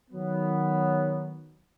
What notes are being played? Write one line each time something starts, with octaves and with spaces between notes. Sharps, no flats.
D#3 F#3 B3